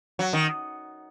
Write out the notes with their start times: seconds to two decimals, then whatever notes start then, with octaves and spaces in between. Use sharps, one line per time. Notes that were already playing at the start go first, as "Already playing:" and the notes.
0.19 F#3
0.33 D#3